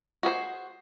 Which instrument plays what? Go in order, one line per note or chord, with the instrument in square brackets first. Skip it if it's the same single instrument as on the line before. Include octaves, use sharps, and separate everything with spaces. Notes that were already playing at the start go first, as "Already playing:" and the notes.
[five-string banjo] F#4 G#4 B4 C5